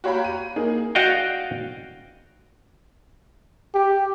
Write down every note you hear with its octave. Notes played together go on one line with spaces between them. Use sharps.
F#4 G4 C#5 F5 A#5 B5
D#7
A#3 D#4 G#4
F#4 D5 D#5 F5 G5
G4